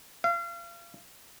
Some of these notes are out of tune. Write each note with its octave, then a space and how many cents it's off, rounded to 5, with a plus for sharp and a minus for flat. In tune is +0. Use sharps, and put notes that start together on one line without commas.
F5 -35